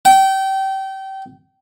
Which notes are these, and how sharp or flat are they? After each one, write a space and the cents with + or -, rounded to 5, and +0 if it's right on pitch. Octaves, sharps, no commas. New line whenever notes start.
G5 -25